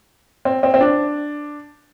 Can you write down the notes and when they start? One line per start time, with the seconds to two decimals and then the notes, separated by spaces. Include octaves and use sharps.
0.45 C4
0.63 C4
0.74 C4
0.81 D4